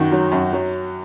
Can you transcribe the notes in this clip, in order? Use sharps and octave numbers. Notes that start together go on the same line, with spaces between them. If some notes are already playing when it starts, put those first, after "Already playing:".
Already playing: F#2 D#3 F#4
F#3
F#2
F#3